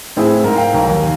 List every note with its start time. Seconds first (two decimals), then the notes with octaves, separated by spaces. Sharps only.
0.17 A2 C4 E4 G#4
0.44 G#2 A#4
0.56 F5 G5
0.74 B1 A#4
0.89 D#2